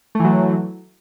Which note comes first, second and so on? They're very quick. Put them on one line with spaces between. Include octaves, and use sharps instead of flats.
A3 E3 F#3